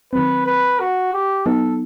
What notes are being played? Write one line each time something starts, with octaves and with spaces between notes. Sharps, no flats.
D#3 F#3 C4 B4
B4
F#4
G4
F#3 B3 D#4 A4